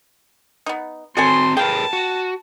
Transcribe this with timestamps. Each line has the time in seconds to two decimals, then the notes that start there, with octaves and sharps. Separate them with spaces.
0.66 B3 D#4
1.17 C4 F#4 A4 C#5 G#5 C6
1.57 G#4 A#4 B4 F5 G5 A5
1.93 F#4